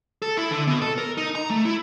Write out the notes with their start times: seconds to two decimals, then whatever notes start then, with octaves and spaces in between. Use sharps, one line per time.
0.22 A4
0.37 E4
0.51 D3
0.67 B2
0.82 A4
0.98 A#4
1.17 D#4
1.35 A#5
1.50 A3
1.65 E4